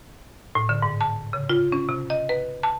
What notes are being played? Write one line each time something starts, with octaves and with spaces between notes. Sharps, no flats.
A2
D3
G#2
A5
C#3
F4
C#4
C3
D#5
B4
A5